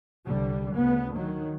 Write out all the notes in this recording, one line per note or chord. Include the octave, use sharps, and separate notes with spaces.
C2 D3 G3
D2 C#3 B3
D#3 F#3